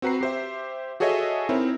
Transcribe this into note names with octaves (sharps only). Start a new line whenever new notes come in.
C4 F#4 B4 A#5 C7
G4 C5 E5
F#4 G#4 A4 C#5 D#5 E5
C4 D#4 E4 A#4 C#5